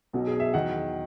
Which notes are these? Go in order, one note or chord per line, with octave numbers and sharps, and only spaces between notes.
B1 B2 F#3
G#4
E5
E2 D#3 F#3 F#5